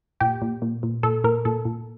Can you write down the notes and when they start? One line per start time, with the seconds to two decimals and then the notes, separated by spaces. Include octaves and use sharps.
0.20 A#2 G4
0.42 A#2
0.62 A#2
0.83 A#2
1.03 A#2 A4
1.24 A#2 A#4
1.45 A#2 A4
1.65 A#2